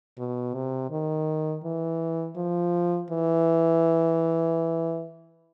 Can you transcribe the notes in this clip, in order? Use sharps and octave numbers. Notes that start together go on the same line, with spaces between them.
B2
C3
D#3
E3
F3
E3